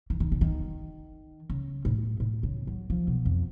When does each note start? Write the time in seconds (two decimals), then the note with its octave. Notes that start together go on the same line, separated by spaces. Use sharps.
0.10 E3
0.20 D#3
0.32 D3
0.41 D#3
1.50 C#3
1.85 A2
2.20 A2
2.43 C#3
2.67 F#3
2.90 F3
3.07 B2
3.26 F2